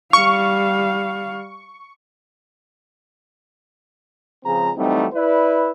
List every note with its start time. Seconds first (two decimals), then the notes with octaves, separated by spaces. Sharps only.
0.13 G3 F5 C#6
4.44 C#2 C#3 F3 C4 G#4 A#5
4.76 E3 F#3 G3 A3 C4 D#4
5.13 E4 B4 D5